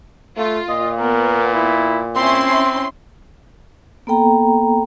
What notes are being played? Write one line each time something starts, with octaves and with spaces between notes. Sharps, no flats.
A3 F4
A#2 D#5
B3 A#4
E4
C4 C#4 E4 C6
A#3 B3 A4 G5 A#5